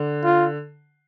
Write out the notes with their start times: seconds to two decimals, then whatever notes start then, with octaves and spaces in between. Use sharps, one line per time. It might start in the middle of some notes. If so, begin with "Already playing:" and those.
Already playing: D3
0.25 F4